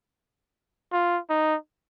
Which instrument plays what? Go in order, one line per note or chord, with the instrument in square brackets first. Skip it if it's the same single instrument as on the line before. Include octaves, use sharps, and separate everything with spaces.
[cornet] F4
D#4